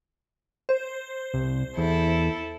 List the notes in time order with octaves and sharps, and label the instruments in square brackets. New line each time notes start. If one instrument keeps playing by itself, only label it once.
[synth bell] C5
[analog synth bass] C2
[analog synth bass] E2 [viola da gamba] E4 A4